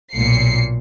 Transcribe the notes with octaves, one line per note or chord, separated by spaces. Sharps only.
B1 A#2 C7 C#7